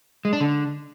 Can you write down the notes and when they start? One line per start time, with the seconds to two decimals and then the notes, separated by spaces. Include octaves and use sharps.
0.25 G#3
0.33 D4
0.41 D3